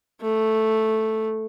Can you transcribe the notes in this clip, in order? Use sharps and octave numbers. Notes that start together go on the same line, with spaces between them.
A3